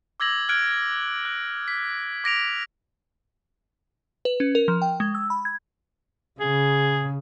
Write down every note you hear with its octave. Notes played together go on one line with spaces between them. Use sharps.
D6 E6 G#6 A#6 F#7
F6 F#6 G#6 D7
F#6
B6
D6 A#6 D7 F7
B4
C#4
A#4
F3
G5
G#3
E6
B5
G#6
C#3 G#4